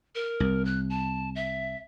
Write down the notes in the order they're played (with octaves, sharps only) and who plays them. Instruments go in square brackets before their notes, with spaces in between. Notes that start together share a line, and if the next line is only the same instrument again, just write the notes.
[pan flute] A#4
[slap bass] C2
[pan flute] F#6
A5
E5